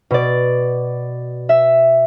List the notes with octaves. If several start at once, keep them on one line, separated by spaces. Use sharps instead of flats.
B2 D5
E5